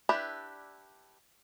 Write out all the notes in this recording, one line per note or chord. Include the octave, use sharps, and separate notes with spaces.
D4 E4 G4 B4 D5